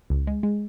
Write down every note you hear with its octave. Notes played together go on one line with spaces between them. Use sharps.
C#2
G#3
G#3